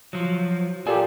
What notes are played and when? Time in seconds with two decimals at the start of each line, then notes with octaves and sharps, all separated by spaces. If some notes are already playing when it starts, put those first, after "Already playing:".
0.13 F3 F#3
0.87 A#2 G4 A4 G#5